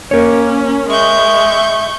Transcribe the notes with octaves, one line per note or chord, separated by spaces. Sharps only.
A#3 C#4 A#4 C#5
G#3 E5 C#6 G6